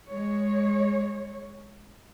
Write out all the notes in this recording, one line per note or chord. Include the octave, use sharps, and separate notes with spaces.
G#3 C#5